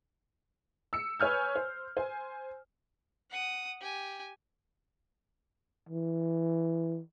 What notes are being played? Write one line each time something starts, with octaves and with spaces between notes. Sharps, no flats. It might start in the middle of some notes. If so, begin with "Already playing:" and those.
E6 C#7
B4 C#5 G#5 F6 G6
C5
C5 G#5
F#5 D#6
G4 G#5
E3